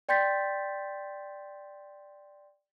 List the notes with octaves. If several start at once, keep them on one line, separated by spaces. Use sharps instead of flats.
D5 G5 C6 G6 A6 B6